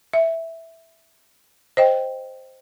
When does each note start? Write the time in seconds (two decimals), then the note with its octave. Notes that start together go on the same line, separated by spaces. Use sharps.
0.13 E5
1.77 C5 D#5 G5